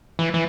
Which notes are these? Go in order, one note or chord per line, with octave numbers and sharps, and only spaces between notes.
E3
E3